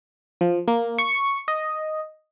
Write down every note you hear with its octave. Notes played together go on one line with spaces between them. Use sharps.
F3
A#3
C#6
D#5